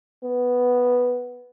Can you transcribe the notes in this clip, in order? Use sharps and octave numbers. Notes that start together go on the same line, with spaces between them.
B3